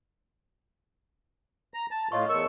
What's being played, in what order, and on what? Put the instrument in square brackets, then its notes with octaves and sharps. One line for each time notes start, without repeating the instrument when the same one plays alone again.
[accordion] A#5
A5
[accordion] A2 F4 [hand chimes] C#5 D#5 C#6
[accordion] E2 C#6 E6 [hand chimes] A#4